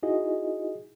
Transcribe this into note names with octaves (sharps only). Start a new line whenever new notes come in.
D#4 E4 F#4 G#4 D#5